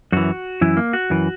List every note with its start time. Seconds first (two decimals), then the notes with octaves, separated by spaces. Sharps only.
0.12 F#2 E3 F#4
0.61 F#2 E3 E4
0.77 A#3
0.93 F#4
1.10 F#2 E3